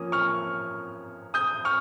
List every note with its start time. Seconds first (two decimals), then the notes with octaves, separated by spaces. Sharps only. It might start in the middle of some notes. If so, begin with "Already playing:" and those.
Already playing: F3 A#3 C#4 D#6
0.12 C#6 F6
1.34 D#6 G6
1.65 C#6 F6